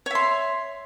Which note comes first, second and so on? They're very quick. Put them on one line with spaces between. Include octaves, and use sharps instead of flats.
C#5 E5 C6